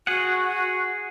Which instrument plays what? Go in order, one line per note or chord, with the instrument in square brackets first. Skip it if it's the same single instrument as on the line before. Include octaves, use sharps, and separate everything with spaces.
[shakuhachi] F#4 [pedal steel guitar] G#4 F#5